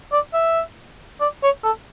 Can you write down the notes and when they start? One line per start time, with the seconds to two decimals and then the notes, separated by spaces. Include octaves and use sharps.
0.13 D5
0.34 E5
1.21 D5
1.43 C#5
1.64 A4